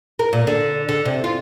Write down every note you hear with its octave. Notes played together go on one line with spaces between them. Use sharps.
A#4
A#2
D3
D3
C3
F4